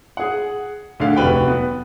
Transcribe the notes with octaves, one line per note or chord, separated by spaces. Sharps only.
G#4 F#5
D2 D3 F5
F1 F#4 B4 G5
B3